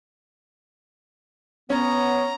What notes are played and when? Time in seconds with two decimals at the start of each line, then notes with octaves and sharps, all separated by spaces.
1.70 B3 C#4 C#5 A#5